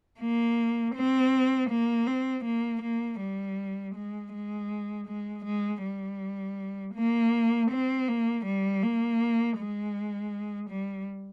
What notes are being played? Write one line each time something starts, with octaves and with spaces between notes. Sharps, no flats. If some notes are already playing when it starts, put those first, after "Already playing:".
A#3
C4
A#3
C4
A#3
A#3
G3
G#3
G#3
G#3
G#3
G3
A#3
C4
A#3
G3
A#3
G#3
G3